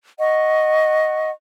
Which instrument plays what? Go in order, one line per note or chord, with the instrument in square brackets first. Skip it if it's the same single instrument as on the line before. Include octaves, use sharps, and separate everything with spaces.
[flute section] D#5 F#5 C#6